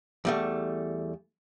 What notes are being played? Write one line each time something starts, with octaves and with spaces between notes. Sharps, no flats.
E2 G3 A3